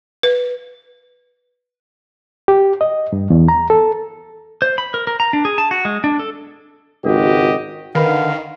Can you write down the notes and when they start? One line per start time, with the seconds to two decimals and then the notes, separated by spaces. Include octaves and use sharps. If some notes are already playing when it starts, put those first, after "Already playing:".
0.23 B4
2.48 G4
2.81 D#5
3.13 G2
3.30 E2
3.48 A#5
3.70 A4
4.62 C5
4.78 B5
4.94 A#4
5.07 A#4
5.20 A#5
5.33 D4
5.45 G#4
5.58 A5
5.71 F#4
5.85 G#3
6.04 D4
6.19 A4
7.04 G#1 C#2 F#4 G4 D#5
7.95 D3 D#3 A#4 B4 F5 B5